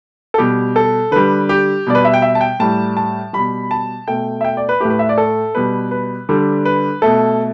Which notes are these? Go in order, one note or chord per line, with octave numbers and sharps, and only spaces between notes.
A4
B2 G3 G4
A4
D3 G3 B4
G4
B2 G3 D5
B4
E5
G5
E5
A5
G5
A2 G3 A5
A5
B2 G3 B5
A5
B2 A3 G5
E5
G5
D5
B4
A2 A3 G4
B4
E5
D5
A4
B2 G3 B4
B4
D3 G3
B4
B2 A3 A4